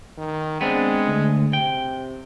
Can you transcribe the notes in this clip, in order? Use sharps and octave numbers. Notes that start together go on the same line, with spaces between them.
D#3
G#3 B3 C4 D4
D2
C3 G5